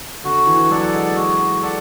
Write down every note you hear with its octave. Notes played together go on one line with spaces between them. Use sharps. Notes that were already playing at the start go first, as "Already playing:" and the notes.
D3 F#4
E3
F#3 A4 D5 F#5
G#3
G#3 F#4
A4 D5 F#5